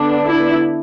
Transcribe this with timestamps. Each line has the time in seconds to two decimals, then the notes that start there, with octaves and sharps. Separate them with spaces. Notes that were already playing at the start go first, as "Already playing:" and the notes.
Already playing: D3 B3 D4
0.23 E4